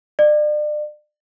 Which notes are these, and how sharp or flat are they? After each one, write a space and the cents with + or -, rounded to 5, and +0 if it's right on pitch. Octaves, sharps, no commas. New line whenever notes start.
D5 +35